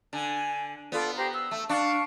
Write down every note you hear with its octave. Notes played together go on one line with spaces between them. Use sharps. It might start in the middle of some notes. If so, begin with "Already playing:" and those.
D3 G#5
B3 F4 A4 D5
G4 C5 A#5
E6
A3
D4 F5 A5 C#6